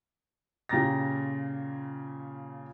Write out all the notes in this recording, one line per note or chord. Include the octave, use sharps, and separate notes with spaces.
A#2 C#3 G4 A#5 A6 A#6